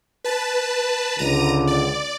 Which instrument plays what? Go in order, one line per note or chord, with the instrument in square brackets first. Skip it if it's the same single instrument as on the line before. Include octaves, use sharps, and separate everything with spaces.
[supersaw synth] B4 A5
[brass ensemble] C#2 D3 [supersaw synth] A#5 D#7
[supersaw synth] D5